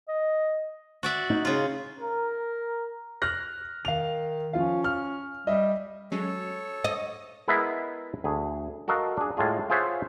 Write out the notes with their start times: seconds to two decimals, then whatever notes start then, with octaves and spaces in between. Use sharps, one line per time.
0.08 D#5
1.03 F#4 D5 E5
1.30 D#4
1.45 C#3 F4
1.99 A#4
3.22 F6 F#6 A#6
3.85 D#3 F5 F7
4.53 F3 C#4 F4 F5
4.84 F6
5.47 G3 D#5 E5
6.12 F#3 G#3 C#4 A4 C#5
6.84 D#5
7.48 G#3 B3 E4 G#4 A#4 E5
8.24 D2 G#4
8.88 F#4 A4 A#4 D#5 F5
9.17 D4 G#4
9.37 A2 G#3 F4 G#4
9.70 F4 G#4 C5 C#5 E5 F#5